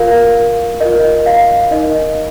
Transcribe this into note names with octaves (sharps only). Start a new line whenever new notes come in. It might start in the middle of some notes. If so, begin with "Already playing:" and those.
Already playing: F4 A#4 F5
F4 A#4 D#5
F5
D#4 A#4 D#5